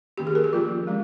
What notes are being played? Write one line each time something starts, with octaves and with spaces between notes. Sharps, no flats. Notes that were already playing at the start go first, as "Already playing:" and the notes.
D#3 A#3 C#4 G4
G#4
A#4
G4
F3 A#3 C#4 F4
F3 G#3 C#4